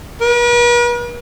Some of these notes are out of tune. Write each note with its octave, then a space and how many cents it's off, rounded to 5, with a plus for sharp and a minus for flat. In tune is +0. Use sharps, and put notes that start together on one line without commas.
B4 -45